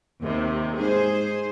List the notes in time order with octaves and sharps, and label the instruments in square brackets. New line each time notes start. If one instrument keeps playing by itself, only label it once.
[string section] D#2 C3
[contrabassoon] G#2 [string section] G#4 C5